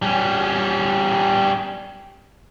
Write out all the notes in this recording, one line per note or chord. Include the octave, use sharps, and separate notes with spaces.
G3 C#4